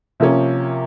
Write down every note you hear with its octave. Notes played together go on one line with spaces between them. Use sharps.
C3 F3 A#3 C#4